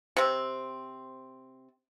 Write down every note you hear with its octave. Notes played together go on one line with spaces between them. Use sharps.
C3 C4